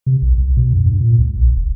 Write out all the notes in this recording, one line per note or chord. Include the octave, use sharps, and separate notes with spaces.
C3
B1
C2
B2
F#2
G2
A#2
C#2
B1
F1